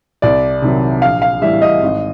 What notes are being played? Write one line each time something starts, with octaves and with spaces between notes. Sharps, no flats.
C2 D5
C3 D#3 F#3
A#1 F5
F5
A2 E3 G3 E5
D#5
G#1